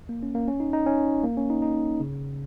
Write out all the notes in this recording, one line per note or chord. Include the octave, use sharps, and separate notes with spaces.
A#3
C#4
A#3
C#4
D#4
D#4
C#4
A#3
C#4
D#4
D#4
C#3